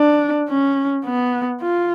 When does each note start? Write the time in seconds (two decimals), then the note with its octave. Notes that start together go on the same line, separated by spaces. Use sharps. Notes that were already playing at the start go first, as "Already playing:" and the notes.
Already playing: D4
0.50 C#4
1.05 B3
1.62 F4